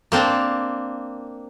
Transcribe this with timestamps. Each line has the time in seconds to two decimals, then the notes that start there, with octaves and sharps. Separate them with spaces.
0.12 A#3 C4 D4